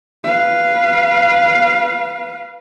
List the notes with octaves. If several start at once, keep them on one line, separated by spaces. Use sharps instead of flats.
B4 F5